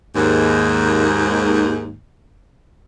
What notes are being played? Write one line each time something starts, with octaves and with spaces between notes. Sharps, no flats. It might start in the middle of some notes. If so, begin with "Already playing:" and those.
D#2 G#2